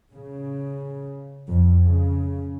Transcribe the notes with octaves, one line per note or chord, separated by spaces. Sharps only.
C#3
F2
C#3